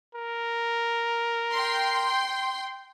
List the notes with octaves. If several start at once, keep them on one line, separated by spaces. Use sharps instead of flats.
A#4
G5 C6